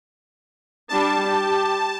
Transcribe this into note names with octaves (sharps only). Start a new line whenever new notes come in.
G3 D4 A5
G4